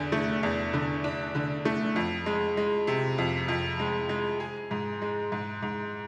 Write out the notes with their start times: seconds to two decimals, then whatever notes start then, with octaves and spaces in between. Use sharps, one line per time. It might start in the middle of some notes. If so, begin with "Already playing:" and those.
Already playing: E2 D3
0.12 A3
0.43 E2
0.73 D3
1.04 D4
1.35 D3
1.65 A3
1.96 F2
2.26 G#3
2.57 G#3
2.87 C3
3.18 F2
3.48 F2
3.79 G#3
4.09 G#3
4.40 G#4
4.71 G#2
5.02 G#3
5.32 G#2
5.62 G#2